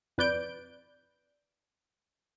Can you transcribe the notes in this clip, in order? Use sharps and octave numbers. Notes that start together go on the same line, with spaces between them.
F2 B4 D5 G6 D7